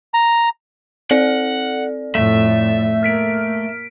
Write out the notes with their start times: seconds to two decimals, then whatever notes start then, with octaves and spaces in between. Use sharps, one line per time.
0.14 A#5
1.11 C4 A4 D5 F#5
2.15 F2 A2 A3 E5
3.03 A#3 F6 B6 D7